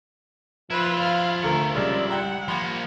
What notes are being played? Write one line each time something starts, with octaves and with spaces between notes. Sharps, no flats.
F3 E4 F4 B4
F5
D2 A3 A#4 C#7
A#1 C#3 G3 G#3 D5
F#5 G5 A#5
F3 A#3 B5 G#6 C#7